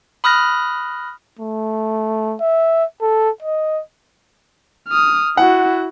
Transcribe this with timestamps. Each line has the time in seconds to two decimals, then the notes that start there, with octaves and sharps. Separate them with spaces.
0.24 B5 D#6 F6 F#6 A#6
1.39 A3
2.41 E5
3.01 A4
3.42 D#5
4.88 D#6 F6
5.37 E4 F#4 F#5